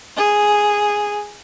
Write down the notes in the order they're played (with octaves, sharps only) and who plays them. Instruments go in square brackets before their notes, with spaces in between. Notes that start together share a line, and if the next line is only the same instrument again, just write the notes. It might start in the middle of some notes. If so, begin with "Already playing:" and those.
[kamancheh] G#4